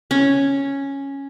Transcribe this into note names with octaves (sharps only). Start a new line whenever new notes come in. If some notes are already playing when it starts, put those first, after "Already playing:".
C#4